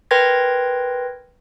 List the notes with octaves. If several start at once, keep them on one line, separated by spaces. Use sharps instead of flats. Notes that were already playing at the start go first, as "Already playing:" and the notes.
A#4 B4 G5 C6 G#6 A#6